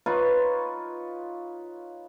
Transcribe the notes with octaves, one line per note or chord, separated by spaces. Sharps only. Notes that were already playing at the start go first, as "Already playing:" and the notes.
D#4 F4 B4 C#5